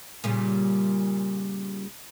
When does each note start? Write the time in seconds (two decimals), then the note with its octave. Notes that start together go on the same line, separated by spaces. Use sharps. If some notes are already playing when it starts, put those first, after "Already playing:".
0.24 A#2 C#3 G3